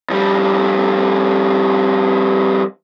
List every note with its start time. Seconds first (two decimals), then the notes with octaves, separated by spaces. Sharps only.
0.10 F2 G3